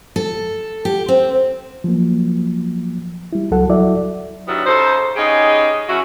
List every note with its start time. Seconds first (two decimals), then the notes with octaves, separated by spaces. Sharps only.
0.16 A4
0.85 G4
1.08 C4
1.84 F3 F#3 A#3
3.33 G3 E4
3.51 C#2 F#3 A4 F#5
3.69 F#3 E4 A4 D5 E5
4.48 D#3 F#3 G3 B3 D4 E4
4.65 C#3 D#4 A4 C5
5.16 B3 C#4 D#4 G4 G#4
5.88 F#2 C#4 E4 F#4